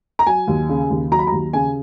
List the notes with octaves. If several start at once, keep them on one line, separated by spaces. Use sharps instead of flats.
A#5
F#3 G#5
D#2
C#3
D#2
F#3 A#5
B5
D#2 A#5
C#3 G#5